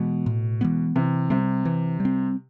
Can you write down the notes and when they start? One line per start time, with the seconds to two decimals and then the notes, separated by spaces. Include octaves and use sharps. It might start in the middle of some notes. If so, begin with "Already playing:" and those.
Already playing: B2 E3 G#3 B3
0.26 A2
0.61 E3 G#3 B3
0.96 C3 E3
1.30 C3 G3 C4
1.65 E3
2.00 G3
2.05 C4